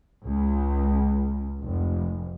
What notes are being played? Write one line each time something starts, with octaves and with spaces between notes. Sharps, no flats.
C#2
F1